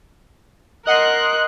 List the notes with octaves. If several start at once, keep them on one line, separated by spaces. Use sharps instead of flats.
A#4 D#5 F#5 C6 F#6